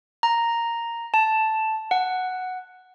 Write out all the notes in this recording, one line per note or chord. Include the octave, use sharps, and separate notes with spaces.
A#5
A5
F#5